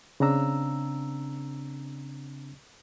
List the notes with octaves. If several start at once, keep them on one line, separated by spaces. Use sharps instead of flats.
C#3 C4 D4 A#5 E6